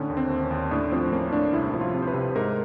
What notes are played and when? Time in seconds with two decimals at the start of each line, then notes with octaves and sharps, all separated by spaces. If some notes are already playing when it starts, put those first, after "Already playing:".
Already playing: A2 D3 C#4
0.09 D#2
0.17 C4
0.30 D#2
0.44 C#4
0.51 D#2
0.71 A2 D4
0.92 F3 C4
1.12 A#3 C#4
1.33 A2 D4
1.53 C2 E4
1.74 F3
1.81 F4
1.94 C3
2.02 C5
2.07 B4
2.14 C3
2.36 G#2 A#4